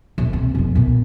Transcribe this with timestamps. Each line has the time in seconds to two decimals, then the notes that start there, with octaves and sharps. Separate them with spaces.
0.18 D#1
0.33 C3
0.55 F2 B3
0.75 A#2 B3